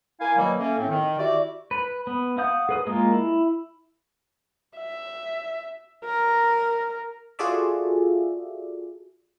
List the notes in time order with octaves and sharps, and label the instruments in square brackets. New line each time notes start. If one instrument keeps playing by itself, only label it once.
[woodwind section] A#3 E4 F5 G#5
B2 D#3 F#3 G3 A#3
A3 A#3 C#4
A2 C4
D#3
E4 F#4 G4 D5
[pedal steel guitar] B4
B3
F5 F#5 D#6 G6
G#4 B4 D#6
G#3 A#3 F4
E4
[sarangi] E5
A#4
[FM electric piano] F4 F#4 G#4 A4 D5 E5